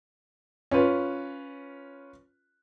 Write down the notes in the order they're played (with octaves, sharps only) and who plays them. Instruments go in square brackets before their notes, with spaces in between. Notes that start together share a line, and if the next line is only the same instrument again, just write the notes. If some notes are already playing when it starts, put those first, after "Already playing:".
[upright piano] C#4 F4 B4